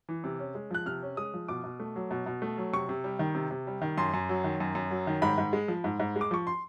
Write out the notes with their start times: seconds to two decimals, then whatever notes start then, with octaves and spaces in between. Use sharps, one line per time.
0.09 E3
0.24 C3
0.39 C#4
0.55 G#3
0.71 F3 F#6
0.86 C3 F6
1.02 C#4
1.17 G#3 D#6
1.34 F3
1.48 B2 D6
1.64 B2
1.80 A3
1.96 F#3
2.11 B2
2.26 B2
2.42 A3
2.58 F#3
2.73 C3 C#6
2.89 C3
3.04 G3
3.19 D#3
3.35 C3
3.51 C3
3.67 G3
3.82 D#3
3.98 F#2 C6
4.14 F#2
4.29 F#3
4.44 D#3
4.60 F#2
4.75 F#2
4.91 F#3
5.07 D#3
5.22 G#2 B5
5.38 G#2
5.53 G#3
5.68 F3
5.84 G#2
6.00 G#2
6.16 G#3
6.21 D6
6.31 F3 C#6
6.47 C6